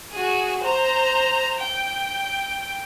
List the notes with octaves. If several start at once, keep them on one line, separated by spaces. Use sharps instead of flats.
F#4 G#4
C5 A#5
G5